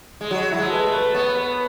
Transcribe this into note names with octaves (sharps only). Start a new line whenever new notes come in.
G#3
F#3 F#4
F#3 E4
G#3
A4
B4
A3
B4
B3 C#5
B4